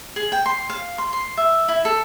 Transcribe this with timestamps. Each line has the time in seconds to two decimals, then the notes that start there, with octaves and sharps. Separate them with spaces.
0.16 G#4
0.32 G5
0.46 C6
0.70 F5
0.98 C6
1.13 C6
1.37 E5
1.68 E4
1.85 A4